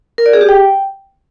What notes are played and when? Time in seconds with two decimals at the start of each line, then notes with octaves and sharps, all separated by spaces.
0.18 A#4
0.26 D5
0.33 G#4
0.41 G4
0.49 G5